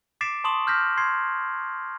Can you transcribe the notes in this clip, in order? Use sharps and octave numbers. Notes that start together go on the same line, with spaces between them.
D6 A6 B6 C7 D7 E7
A5 C6 C#6 D#6 E7 F#7
F6 G6 A#6 B6
C6 G#6 C7